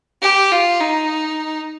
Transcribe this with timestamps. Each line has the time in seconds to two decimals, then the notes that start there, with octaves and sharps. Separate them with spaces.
0.22 G4
0.51 F4
0.80 D#4